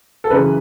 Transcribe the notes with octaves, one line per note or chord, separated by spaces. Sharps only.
A4
F#2 C#3 E3 B4